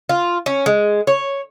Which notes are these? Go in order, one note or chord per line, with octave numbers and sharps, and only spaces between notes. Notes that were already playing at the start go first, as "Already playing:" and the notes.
F4
C#4
G#3
C#5